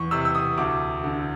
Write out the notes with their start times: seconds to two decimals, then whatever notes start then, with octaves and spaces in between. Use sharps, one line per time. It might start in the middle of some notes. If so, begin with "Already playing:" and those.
Already playing: E2 C#6
0.11 C3 E6
0.25 E6
0.35 D#6
0.58 D2 D6
1.04 D3